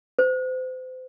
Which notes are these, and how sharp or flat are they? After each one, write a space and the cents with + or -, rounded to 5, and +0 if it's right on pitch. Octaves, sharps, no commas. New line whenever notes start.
C5 -35